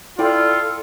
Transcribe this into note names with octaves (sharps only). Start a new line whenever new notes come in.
E4 F4 A4 D5 G5